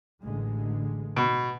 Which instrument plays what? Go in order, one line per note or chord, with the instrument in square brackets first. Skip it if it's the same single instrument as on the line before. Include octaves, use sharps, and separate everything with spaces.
[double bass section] A1 D3 G#3
[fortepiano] B2